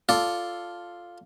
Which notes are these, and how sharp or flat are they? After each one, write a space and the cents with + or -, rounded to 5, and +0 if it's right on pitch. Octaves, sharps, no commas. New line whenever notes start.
F4 +0 A4 +0 D5 +0